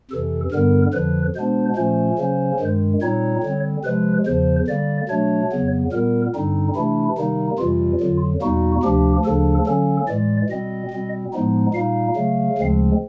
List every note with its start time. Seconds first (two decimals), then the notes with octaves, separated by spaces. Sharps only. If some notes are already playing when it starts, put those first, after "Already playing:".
0.11 F2 C3 E3 A4
0.52 G2 D3 G3 B3 A#4
0.93 F2 D3 F3 B4
1.36 B2 G#3 B3 D4 C5
1.76 A#2 F3 A3 C#4 C5
2.18 C#3 F#3 A#3 C#4
2.60 G2 D#3 G#3
3.01 A#2 G3 C4 D#4 C#5
3.43 D3 G3 C4
3.84 C3 F3 G#3 B4
4.26 E2 C#3 F3 C5
4.67 D3 G3 A#3 D5
5.09 B2 F#3 A3 D4 C#5
5.51 F2 C#3 F#3 B3
5.92 A#2 G3 B3 A#4
6.34 G2 D3 G3 C4 D#4
6.75 C3 E3 A3 D4 E4
7.18 C3 D#3 G3 A#3 D#4
7.59 F2 C3 E3 G3 F4
8.00 F2 D3 F#3
8.42 E2 B2 G3 A#3 D#4 F#4
8.83 D2 C3 F3 A#3 D4 G4
9.25 D2 C#3 F3 A#3 D4 A4
9.67 D3 F#3 A#3 C#4 A4
10.08 A2 E3 G#3 D5
10.50 B2 G3 C4 D#5
10.91 B2 G3 C4
11.33 A2 F3 G#3 B3 D#4
11.74 A#2 G3 A#3 D#4 F5
12.16 C#3 F#3 A3
12.58 D2 C#3 F3 G#3 C4